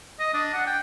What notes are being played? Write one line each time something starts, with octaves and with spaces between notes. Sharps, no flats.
D#5
D4
F#5
G5